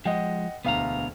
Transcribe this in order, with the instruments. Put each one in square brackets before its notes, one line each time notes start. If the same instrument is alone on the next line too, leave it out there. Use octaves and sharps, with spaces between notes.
[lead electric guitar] F3 G#3 [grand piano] D#5 F#5 G5
[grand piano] E1 D2 F5 [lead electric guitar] B3 A#5